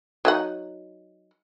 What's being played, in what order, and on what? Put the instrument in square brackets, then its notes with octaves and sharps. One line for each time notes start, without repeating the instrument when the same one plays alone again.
[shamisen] F#3 D#4 F#5